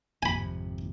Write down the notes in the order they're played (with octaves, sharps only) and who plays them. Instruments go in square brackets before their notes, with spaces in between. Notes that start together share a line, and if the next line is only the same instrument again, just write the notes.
[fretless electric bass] G#1 F2 C3 [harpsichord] G#5 B5